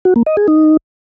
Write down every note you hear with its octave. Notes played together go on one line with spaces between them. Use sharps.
F#4
A#3
D#5
G#4
D#4